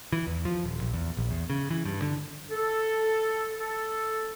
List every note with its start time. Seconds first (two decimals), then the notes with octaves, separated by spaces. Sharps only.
0.12 E3
0.27 E2
0.45 F3
0.63 D#1
0.81 A#1
0.93 E2
1.17 A#1
1.31 E2
1.50 C#3
1.70 E3
1.85 G2
2.02 D3
2.50 A4
3.58 A4